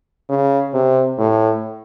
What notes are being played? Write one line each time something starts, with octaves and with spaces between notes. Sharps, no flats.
C#3
C3
A2